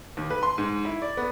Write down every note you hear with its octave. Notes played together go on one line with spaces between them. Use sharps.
D#2
B4
C6
G#2
E4
D5
B3